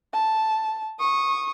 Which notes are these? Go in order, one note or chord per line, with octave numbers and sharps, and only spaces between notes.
A5
C#6 D#6